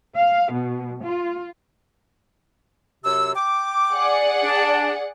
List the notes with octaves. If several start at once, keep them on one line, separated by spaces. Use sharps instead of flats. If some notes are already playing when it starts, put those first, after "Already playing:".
F5
B2
F4
F#2 C3 E6
G5 D6
G#4 D5 F#5
D4